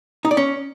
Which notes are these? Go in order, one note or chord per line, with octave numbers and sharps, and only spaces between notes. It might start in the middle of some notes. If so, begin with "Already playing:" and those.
D#4
D5
C#4